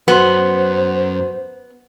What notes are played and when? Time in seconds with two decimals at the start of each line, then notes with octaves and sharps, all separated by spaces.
0.08 F#2 B3 F#4 C5 C6